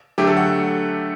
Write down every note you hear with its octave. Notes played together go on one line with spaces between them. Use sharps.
D3 F#3 A3 G4
A4
F#5